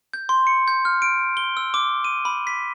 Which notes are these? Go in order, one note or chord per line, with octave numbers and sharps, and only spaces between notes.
G6
C6
C#7
G6
F6
D7
G7
E6
D6
D#7
B5
B6